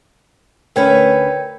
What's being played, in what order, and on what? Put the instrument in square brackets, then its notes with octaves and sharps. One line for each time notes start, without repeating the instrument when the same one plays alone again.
[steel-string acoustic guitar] D2 C#4 B4 [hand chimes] A#4 G5 G#6